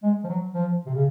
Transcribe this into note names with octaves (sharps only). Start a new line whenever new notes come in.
G#3
F3
F#3
F3
C3
C#3